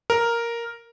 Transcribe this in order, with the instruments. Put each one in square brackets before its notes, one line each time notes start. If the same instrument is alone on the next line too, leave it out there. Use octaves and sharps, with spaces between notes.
[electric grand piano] A#4